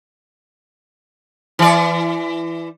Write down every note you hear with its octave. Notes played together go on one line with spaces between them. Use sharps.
E3 D5